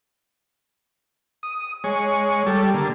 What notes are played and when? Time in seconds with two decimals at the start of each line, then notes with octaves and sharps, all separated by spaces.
1.43 D#6
1.84 G#3 C#5
2.46 G3 A4
2.74 D3 A#3